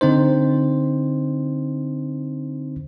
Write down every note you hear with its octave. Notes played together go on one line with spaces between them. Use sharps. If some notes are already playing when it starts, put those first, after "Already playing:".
D3 C4 D#4 C5